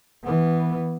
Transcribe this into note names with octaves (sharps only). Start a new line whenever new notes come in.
E3 B3